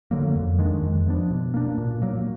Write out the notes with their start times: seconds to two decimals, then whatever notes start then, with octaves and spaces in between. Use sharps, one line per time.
0.11 D3 F#3 A#3
0.35 F2
0.59 D#3 G#3 D4
0.82 F2
1.06 F3 B3 D4
1.31 B2
1.54 A#3 D4
1.78 A#2
2.02 F#3 A#3